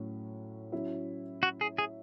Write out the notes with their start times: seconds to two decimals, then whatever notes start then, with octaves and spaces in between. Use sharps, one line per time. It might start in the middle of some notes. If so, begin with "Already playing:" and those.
Already playing: A2 F#3 C#4
0.72 F#3 C#4 E4
1.43 F#4
1.61 G#4
1.78 G#4